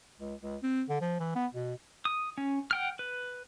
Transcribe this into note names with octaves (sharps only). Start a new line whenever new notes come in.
C#2
C#2
C4
D3
F3
E3
B3
B2
D#6
C#4
F#5 G5 F6
B4